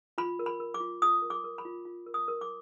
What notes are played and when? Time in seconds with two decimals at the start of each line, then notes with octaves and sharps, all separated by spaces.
0.18 F4 B5
0.39 A#4
0.46 B5
0.60 A#4
0.74 D6
0.80 F4
1.02 F4 D#6
1.22 A#4
1.30 D6
1.44 A#4
1.58 B5
1.65 F4
1.85 F4
2.06 A#4
2.14 D#6
2.28 A#4
2.41 D6